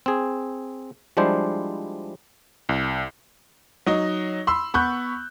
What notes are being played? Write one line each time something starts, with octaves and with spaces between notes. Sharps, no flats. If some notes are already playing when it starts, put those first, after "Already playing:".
C4 G#4
F3 G3 G#3 D4 E4 C5
C2
F#3 D#4 D#5
B5 C6 E6
B3 B5 C#6 F#6 G6